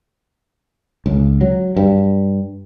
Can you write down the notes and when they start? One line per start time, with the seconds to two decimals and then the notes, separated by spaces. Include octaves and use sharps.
1.06 C#2
1.41 F#3
1.77 G2